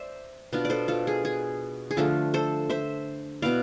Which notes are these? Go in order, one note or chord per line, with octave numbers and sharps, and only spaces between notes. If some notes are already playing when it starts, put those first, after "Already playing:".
Already playing: C5 D5 E5
B2 B3 D4 F4
D5
A4 C5
F4 A4
G#4
G#4
G#4
D3 F3 A3 D4 F4 A4
A4 C5
C5 E5
B2 B3 E4 D5 F5